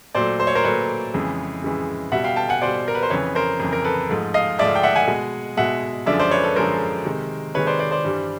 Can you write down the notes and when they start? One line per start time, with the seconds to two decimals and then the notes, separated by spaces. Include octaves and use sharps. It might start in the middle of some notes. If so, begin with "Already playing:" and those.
0.15 A#2 F#3 A3 C5 D5
0.40 C5
0.47 C#5
0.55 A#4 C5
0.64 A#2 F#3 A3 B4 C#5
1.14 F2 C#3 E3 G#3
1.62 F2 C#3 E3 G#3
2.12 B2 G3 E5 F#5
2.24 F5 G5
2.36 G5 A5
2.49 F#5 G#5
2.62 B2 G3 C5 D5
2.88 A#4
2.95 B4
3.03 C5
3.10 F2 C#3 E3 B4 C#5
3.35 A#4 C5
3.60 F2 C#3 E3
3.73 A#4
3.84 A4 B4
4.09 G#2 F3 A3
4.34 D#5 F5
4.59 G#2 F3 A3 D5 E5
4.75 G5
4.83 E5 F#5
4.96 F#5 G#5
5.07 B2 G#3
5.57 B2 G#3 E5 F#5
6.06 F#2 D3 F3 G#3 D5 E5
6.19 C5 D5
6.31 B4 C#5
6.43 A4 B4
6.56 F#2 D3 F3 G#3 A#4 C5
7.05 C3 D#3 G#3
7.54 C3 D#3 G#3 B4 C#5
7.67 C5 D5
7.79 C5 D5
7.91 C5 D5
8.04 G2 E3 G3